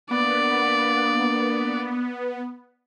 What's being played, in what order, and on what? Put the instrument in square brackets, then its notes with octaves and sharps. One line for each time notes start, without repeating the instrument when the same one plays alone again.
[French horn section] A#3 D4 [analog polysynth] B3 [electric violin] D5